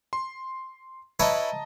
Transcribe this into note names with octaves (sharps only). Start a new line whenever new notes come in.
C6
E4 B4 C#5 D#5 A5 A#5